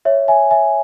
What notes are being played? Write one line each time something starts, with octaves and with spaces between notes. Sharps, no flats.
C#5 E5
E5 G#5
E5 G#5